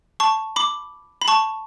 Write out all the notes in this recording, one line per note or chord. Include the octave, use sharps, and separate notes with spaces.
A5 C#6
B5 D6
B5
A5 C#6